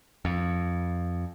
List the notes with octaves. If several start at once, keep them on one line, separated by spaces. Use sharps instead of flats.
F2